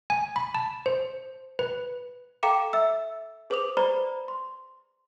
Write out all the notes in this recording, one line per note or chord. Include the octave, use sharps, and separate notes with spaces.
G#5
B5
A5
C5
B4
A4 F5 G5 A#5 D6 E7
E5 E6
G#4 B4 C5 D6 D#6 F7
C5 D5 A#5 B5
C6